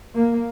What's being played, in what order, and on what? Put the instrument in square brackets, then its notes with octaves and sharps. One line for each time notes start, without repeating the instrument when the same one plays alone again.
[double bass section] A#3